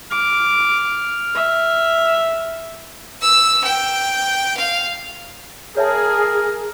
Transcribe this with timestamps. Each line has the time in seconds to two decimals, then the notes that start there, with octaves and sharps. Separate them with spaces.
0.11 D6 F6
1.34 E5
3.22 E6
3.64 G5
4.57 F5
5.77 G#4 A#4 C#5 E5 A5